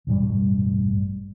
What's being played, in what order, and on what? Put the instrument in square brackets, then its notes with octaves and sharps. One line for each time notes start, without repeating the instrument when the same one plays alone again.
[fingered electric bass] E1 A1 G2 G3